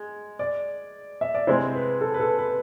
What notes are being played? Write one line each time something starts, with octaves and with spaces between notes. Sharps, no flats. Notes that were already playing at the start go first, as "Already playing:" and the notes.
Already playing: G#3
D5
E5
D5
C3 G#3 C4 E4 C5
B4
A4
B4
A4
B4